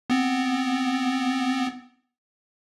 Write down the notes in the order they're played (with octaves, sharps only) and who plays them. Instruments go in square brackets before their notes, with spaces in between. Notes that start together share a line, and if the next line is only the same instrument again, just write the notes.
[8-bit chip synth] B3 C4